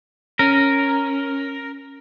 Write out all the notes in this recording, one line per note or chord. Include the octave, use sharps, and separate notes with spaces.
C#4 A#4